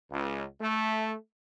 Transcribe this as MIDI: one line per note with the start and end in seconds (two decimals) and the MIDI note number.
0.11 0.44 37
0.61 1.14 57